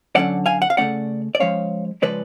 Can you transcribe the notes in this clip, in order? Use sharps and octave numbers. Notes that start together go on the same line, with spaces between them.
D3 F#3 A3 C#4 D5 F#5
F5 G#5
F#5
F5
C#3 F#3 A3 C#4 D5 F#5
D5
F3 G#3 C#4 C#5 F5
C#3 F3 G#3 C#4 B4 D5